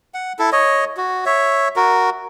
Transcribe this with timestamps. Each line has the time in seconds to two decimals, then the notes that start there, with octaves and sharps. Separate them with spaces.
0.14 F#5
0.39 E4 A4
0.52 C#5 D#5
0.97 F#4
1.26 C#5 E5
1.76 F#4 A#4